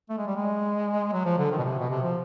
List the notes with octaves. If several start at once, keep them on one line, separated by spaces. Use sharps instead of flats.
A3
G#3
G3
G#3
F#3
F3
D3
D#3
B2
C3
B2
C3
F3